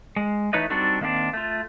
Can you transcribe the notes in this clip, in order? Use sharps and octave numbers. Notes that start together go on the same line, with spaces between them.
G#3
E3 A3 D#4 B4 C#5 D#5
G3 C4 D4 D#4 F#4 A4
D#3 A#3 C4 D4
A3 F4